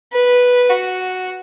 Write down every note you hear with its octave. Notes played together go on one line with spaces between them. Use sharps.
B4
F#4